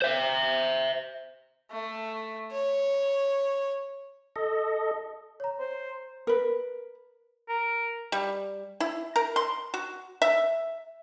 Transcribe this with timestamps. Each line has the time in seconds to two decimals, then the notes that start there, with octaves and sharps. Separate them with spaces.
0.02 C5 E5
1.71 A3
2.52 C#5
4.36 A4 D#5
5.40 C#5 A#5
5.59 C5
6.27 A#4 B4
7.48 A#4
8.12 G3
8.80 E4
9.16 A#4
9.36 C6
9.74 F#4
10.22 E5